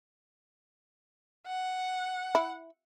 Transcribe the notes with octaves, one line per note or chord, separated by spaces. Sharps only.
F#5
E4